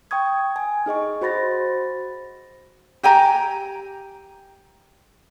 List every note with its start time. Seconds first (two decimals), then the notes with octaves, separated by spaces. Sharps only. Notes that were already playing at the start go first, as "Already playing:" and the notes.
0.11 G5 C#6 D#6 G#6
0.56 G#5
0.86 D#4 G#4 D#5 C#6
1.21 F#4 C5 B5 A6 A#6
3.03 G4 G5 G#5 A#5